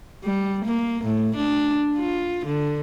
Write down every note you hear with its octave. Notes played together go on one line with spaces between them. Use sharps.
G3
A#3
A2
D4
F4
D3